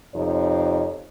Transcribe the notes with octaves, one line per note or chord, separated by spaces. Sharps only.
F2 C3 D#4 C5 C#5